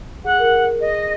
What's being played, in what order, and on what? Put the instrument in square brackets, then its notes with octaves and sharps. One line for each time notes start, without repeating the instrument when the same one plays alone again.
[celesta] G#4 [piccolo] F#5
[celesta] A#4
[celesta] G#4 [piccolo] D#5